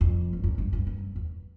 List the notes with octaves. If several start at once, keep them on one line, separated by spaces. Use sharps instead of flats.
F2
G2
F#2
G2
G2
F#2
E2